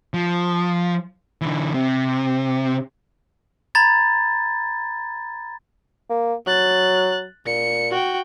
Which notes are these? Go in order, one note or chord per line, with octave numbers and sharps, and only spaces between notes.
F3
D3 E3
C3
A#5 B5 G#6 A6
A#3
F#3 F#6 A6
A#2 C#7
F#4 G5